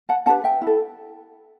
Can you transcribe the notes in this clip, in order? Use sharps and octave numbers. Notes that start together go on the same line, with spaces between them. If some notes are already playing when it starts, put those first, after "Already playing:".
F#5 A5
D4 G4 B4 F#5 A5
E5 G5
E4
A4